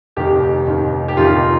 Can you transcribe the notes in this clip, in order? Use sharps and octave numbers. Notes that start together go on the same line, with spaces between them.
F1 D#2 D#3 G4
F1 D#2 D#3
G4
F1 D#2 D#3 F4